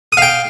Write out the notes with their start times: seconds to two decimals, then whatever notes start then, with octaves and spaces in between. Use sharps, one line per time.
0.12 D#6
0.17 F5
0.22 G5